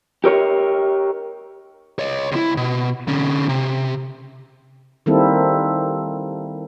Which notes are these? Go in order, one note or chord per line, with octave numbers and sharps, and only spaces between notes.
G4 A#4 C#5
C#5 D#5
C#2 E4
B2
D3 C#4
C3
D#3 G3 A#3 C4 E4 A4